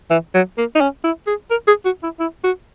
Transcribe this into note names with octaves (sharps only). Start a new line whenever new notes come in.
E3
F#3
A#3
D#4
C#4
E4
G#4
A#4
G#4
F#4
E4
E4
F#4